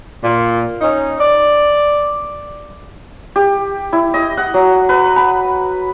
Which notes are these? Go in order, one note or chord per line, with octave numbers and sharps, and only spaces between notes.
A#2
C#4 D#4
D5
G4
E4
D#5
F#5
F#3
B4
B5